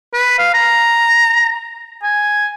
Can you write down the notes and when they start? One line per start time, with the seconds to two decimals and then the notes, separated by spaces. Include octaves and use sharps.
0.13 B4
0.38 F5
0.54 A#5
2.03 G#5